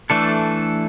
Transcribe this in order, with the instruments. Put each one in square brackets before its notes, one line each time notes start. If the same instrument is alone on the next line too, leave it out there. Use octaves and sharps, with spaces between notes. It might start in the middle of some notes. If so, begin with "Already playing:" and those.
[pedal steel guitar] E3 A3 D4 A4